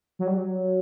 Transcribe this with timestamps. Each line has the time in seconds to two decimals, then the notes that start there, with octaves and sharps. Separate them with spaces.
0.19 F#3
0.27 G3
0.35 F#3